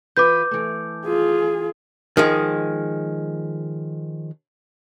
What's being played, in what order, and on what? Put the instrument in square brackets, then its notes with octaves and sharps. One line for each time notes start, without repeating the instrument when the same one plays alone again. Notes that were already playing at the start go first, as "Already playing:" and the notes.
[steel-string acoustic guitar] E3 F4 B4 [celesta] D6 G6
[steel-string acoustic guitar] E3 A3
[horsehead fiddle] F4 G#4
[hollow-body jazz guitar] D#3 F3 G#3